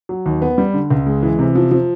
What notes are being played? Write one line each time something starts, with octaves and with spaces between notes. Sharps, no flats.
F#3
D#2
B3
G3
D3
C#2
G#3
E3
C3
F3
F3